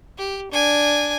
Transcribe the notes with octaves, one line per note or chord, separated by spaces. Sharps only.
G4
D4 G#5